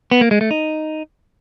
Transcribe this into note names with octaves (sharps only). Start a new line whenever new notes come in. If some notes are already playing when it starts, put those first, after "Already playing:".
B3
A#3
G#3
A3
D#4